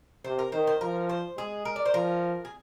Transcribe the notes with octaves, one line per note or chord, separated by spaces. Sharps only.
C3 C5
A#4
D#3 C5
C5
F3 A#4
C5
G#3 G#4
A#4
D5
C5
F3 A#4
G#4